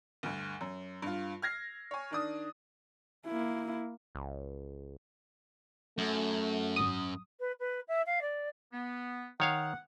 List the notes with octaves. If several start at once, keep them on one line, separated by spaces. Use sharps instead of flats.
D2 G2
F#2
G2 F4
F6 G#6 A#6 C7
C#5 G#5
D#3 D4 D#6
A#3 E4
C#2
F#2 A3
G#1 D#6
B4
B4
E5
F5
D5
B3
D#3 C#5 F5 F#5